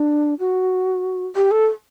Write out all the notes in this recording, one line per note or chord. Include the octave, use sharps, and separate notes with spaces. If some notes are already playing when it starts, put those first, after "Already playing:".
Already playing: D4
F#4
G4
A4